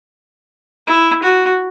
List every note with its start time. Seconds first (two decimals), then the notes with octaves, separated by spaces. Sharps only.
0.87 E4
1.23 F#4